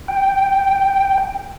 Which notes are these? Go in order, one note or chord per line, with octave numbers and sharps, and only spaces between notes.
G5